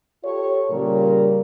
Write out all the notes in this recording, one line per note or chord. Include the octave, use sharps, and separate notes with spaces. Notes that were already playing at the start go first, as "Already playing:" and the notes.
F4 G4 A4 C#5
A#2 C#3 G3 A#4